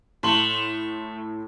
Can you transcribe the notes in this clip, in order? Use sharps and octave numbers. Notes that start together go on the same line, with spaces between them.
A2 A3 C6 F#7